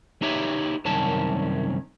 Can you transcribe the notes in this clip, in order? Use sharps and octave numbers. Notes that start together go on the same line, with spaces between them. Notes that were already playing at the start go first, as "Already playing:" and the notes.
D#4 E4 G4 B4 C#5 E5
C2 F#2 D#3 C#4 A5